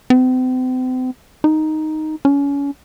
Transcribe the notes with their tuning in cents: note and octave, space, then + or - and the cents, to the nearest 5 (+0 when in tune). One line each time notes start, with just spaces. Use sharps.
C4 -40
D#4 +0
C#4 +30